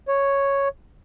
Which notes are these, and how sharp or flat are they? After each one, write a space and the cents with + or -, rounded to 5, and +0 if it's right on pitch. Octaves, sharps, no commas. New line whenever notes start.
C#5 +0